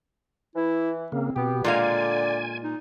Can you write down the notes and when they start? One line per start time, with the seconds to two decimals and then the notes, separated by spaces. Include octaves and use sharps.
0.56 E3 E4
1.12 C#3 A#3 C4
1.36 B2 B3 C4 G4
1.64 A#2 D3 G#3 D5 F5 G#5
2.63 D#4